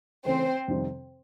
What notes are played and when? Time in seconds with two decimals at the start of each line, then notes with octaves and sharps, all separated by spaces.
0.25 C#3 E3 A3 C4 C#4 C5
0.68 F2 C3 D#3 G3 C4